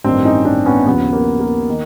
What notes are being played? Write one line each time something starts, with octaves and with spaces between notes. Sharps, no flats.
A1 G2 D#3 C4 D4
C#4 D#4
C4 D4
B3 C#4
D#2 C#3 F3 B3
A#3
A#3
D#3